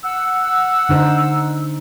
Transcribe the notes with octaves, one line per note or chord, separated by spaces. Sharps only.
F#5 E6
D3 D#4 C5